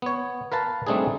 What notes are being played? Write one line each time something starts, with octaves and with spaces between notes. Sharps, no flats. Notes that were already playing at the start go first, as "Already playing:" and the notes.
B3 C#5
A#4 B4 F5 A5
G3 A3 C4 D4 D#4 G#4